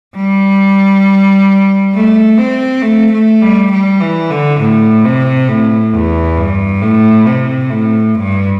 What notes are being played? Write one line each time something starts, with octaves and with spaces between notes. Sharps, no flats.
G3
A3
C4
A3
A3
G3
G3
E3
D3
A2
C3
A2
E2
G2
A2
C3
A2
G2